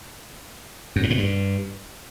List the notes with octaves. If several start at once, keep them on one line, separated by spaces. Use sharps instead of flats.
F#2
G#2
A2
G2